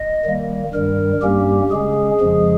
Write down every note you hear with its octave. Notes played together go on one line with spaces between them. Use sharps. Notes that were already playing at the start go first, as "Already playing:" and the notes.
Already playing: D#5
D#3 G3 A#3
G2 D#3 G3 A#4
G2 G3 A#3 C#4 G4
C#3 G#3 C#4 G#4
F2 C#3 F3 G#3